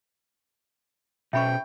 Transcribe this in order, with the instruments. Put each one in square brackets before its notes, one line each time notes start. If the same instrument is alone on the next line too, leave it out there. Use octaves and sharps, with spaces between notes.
[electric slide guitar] B2 C#4 [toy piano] E5 B5 C#6 [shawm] G5